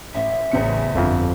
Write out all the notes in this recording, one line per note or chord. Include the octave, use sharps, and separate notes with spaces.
A1 E5
A1 E2 C#3 C4 C#7
G1 F2 D3